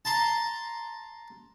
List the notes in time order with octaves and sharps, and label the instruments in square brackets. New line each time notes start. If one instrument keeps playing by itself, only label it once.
[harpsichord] A5 A#5 C6